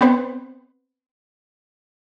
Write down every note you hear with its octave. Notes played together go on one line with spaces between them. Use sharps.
B3 C4 B4 C5